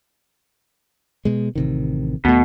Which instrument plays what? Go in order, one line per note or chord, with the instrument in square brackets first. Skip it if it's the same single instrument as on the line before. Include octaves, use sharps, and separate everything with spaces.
[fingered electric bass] B2 G#3
A1 C3 D#3
[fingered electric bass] D#2 A3 [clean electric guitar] B2